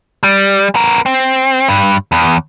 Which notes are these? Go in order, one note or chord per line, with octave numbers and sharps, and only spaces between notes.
G3
B3 A#4
C4
G2
E2